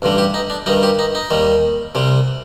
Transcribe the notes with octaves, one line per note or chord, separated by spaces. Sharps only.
A1 G2 D3 G3
G4
D#4
D4
G2 D#3 G3 D#4
G4
D#4
D#4
D#2 D#3 G3
C2 C3 G3